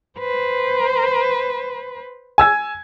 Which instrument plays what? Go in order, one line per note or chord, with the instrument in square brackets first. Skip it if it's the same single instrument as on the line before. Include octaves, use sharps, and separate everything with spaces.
[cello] B4 C5
[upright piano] G#5 E6 G#6